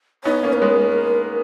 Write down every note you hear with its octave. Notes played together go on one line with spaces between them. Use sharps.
B3 D#4 C#5
A#3 C#4
A#4
G#3 B3